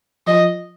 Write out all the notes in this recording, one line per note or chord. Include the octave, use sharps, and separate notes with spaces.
F3 D#5